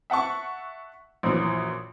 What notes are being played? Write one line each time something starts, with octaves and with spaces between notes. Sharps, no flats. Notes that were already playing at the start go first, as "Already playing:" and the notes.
E5 F#5 A5 C#6
A#1 F#2 A#2 E3